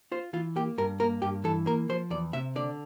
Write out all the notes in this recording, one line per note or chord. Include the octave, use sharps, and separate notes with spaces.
F4 C5
E3 F4
A#3 G4
G2 A#4
A#3 A#4
G2 G4
E3 A4
A#3 A#4
F3 C5
E2 D5
C3 E5
D3 D5